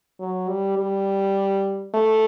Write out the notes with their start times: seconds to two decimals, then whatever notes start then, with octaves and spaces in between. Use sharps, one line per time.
0.20 F#3
0.49 G3
0.78 G3
1.94 A3